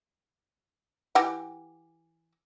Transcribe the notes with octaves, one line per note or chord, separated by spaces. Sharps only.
E3 G4 F#5